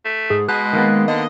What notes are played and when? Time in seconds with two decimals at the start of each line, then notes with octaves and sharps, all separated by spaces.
0.05 A3
0.30 G#2 G#4
0.48 B2 G#3 F#6
0.73 D#3 A#3 B3
1.08 D3 D#5